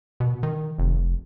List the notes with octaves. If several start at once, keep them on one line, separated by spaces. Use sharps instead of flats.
B2
D#3
F1